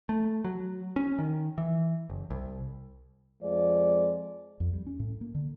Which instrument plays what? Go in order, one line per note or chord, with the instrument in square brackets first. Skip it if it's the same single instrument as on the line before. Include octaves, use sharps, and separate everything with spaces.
[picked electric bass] A3
F#3
C#4
D#3
E3
F#1
C2
[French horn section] F2 F3 G#3 D5
[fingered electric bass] F2
G3
C#4
A2
A#3
D3